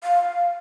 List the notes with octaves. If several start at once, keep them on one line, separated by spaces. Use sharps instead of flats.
F5